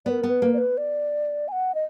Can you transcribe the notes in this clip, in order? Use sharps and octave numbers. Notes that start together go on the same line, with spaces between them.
B3 A#4 D5
B3
B4
A#3
D5
B4
D5
G#5
F#5
D#5